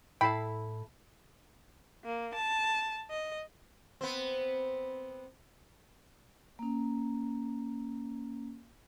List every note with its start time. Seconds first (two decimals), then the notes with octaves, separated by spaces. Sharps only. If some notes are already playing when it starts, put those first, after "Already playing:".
0.21 A2 E4 A4 G5 A5 B5 C7
2.05 A#3
2.35 A5
3.10 D#5
4.01 B3 C4
6.59 A#3 C#4